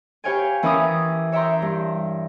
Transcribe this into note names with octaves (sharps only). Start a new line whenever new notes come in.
G4 B4 C#5 F5 G5 G#5
E3 C#4 A#4 B4 D6 D#6
C#5 E5 G5 A#5 C6
G2